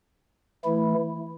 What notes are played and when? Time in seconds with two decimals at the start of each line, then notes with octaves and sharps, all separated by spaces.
0.65 E3 A3 E4